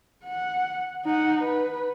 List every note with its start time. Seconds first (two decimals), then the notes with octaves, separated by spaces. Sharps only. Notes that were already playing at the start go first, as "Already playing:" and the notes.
0.25 F#5
1.05 D#4 F#5
1.42 B4